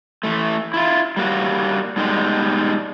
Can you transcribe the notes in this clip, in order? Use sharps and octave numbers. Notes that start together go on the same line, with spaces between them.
E3 A3
E4 F4
G3 A#3 F#4
G#2 B2 G3 G#3